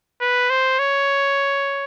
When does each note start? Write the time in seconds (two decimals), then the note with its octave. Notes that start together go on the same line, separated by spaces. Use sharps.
0.21 B4
0.50 C5
0.79 C#5